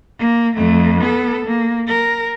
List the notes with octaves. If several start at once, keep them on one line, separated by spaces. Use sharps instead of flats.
A#3
F2 A3
B3 A4
A#3
A#4